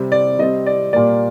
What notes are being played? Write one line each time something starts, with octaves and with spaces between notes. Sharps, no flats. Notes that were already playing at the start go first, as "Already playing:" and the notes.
Already playing: C3 G3 C4
D5
C3 G3 C4 D#5
D5
A#2 G3 A#3 D5